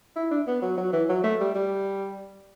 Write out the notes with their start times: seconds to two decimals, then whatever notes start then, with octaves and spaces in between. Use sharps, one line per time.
0.16 E4
0.31 D4
0.47 B3
0.62 F#3
0.78 F#3
0.93 E3
1.09 F#3
1.24 A3
1.40 G3
1.55 G3